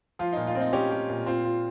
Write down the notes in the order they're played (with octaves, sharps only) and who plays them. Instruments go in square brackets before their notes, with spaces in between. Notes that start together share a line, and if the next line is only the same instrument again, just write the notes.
[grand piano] F3 [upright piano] F4
[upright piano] D#4
[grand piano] A#2
[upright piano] F4
[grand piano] C4
[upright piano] D#4
[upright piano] C#4 [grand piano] G4
[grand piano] G4
A#2
[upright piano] C4 [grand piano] F4
[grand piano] F4